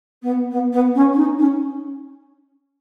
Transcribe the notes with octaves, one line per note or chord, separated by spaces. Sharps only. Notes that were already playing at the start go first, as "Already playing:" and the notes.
B3
B3
B3
C#4
C#4
D#4
C#4